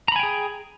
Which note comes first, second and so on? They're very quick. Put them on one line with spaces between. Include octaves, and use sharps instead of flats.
A#5 B5 G#5 G5 G#4